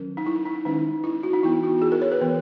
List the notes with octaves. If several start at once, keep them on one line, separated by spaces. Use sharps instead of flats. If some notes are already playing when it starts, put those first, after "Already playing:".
Already playing: D#3 F#3 C#4 A#4
D#4
E4
D#4
D#3 G#3 C#4 D#4
E4
F#4
D#4
E3 B3 E4
F#4
F#4
G#4
A#4
C#5
B4
E3 B3